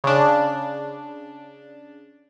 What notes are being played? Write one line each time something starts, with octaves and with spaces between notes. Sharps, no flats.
C#3 D4